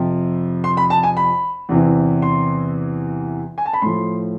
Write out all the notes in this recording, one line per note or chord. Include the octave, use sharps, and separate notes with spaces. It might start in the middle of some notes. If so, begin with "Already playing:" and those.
Already playing: F2 C3 F3
C6
B5
A5
G#5
B5
E2 C3 E3
C6
G#5
A5
B5
A2 F3 C6